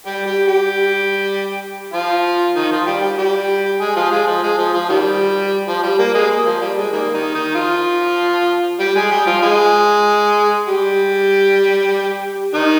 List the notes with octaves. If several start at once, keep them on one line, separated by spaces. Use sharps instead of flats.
G3 G4
G3 G4
G3 G4
F3 F4
D#3 D#4
F3 F4
G3 G4
G3 G4
G3 G4
G#3 G#4
F3 F4
G#3
F3
G#3
F3
F3
D#3 G3
F3
G3
A#3
G#3
A#3
F3
G3
G#3
D#3 G3 A#3
D#3 D#4
D#3 D#4
F3 F4
G3 G4
G#3 G#4
G3 G4
F3 F4
G#3 G#4
G3 G4
D#3 D#4